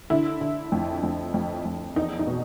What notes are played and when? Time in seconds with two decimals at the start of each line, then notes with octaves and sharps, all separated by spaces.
0.10 D3 E4
0.41 D3
0.72 F2
1.03 F2
1.34 F2
1.65 F2
1.96 E2 D#4
2.19 D#4
2.27 B2